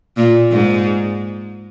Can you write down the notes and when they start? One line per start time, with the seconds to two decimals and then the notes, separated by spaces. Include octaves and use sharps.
0.17 A#2
0.51 G#2